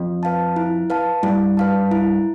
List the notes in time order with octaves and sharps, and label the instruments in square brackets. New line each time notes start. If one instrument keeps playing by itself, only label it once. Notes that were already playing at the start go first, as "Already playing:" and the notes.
Already playing: [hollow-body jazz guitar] F2
[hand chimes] B4 F5 A5
E4
B4 F5 A5
[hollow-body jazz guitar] G2 [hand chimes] E4
[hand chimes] B4 F5 A5
E4